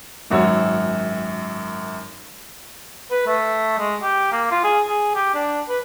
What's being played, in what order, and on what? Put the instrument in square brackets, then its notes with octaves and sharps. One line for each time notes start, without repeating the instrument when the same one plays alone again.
[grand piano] G#1 F#2 F#4 C#5 E6
[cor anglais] B4
A3
G#3
G4
A#3
F4
G#4
G#4
G4
D4
B4